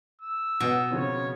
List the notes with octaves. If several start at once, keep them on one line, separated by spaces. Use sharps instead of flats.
E6
B2 F#3 B3
C#3 F3 C4 C#5